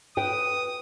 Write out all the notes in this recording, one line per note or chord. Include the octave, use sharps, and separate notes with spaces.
B4 G5 D#6